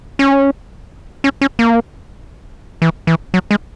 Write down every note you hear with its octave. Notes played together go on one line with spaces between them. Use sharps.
C#4
C#4
C#4
A#3
E3
E3
F#3
G#3